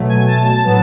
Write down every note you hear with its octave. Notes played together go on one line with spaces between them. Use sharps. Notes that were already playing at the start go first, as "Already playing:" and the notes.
Already playing: B2 F#3 A3
G#5
A5
A5
A2 F#3 B3